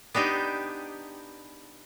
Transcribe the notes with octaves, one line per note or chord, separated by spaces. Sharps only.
B3 D4 D#4 G4